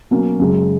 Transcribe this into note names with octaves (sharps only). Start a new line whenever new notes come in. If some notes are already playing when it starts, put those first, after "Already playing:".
B2 F#3 A#3 C#4
F#2 C#3 G#3